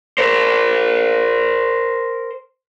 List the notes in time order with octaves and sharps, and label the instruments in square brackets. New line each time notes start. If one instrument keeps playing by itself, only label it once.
[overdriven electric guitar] A#4 C5